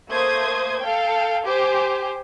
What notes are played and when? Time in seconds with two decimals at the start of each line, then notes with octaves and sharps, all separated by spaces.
0.10 A3 A#3 C5 D#6 G#6
0.80 A4 F5 G5
1.45 G4 C5 G#5